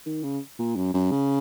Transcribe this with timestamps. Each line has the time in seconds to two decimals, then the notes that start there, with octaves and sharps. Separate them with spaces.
0.06 D#3
0.24 C#3
0.59 A#2
0.76 F#2
0.94 F#2
1.12 C#3